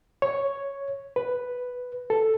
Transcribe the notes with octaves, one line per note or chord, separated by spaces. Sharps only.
C#5
B4
A4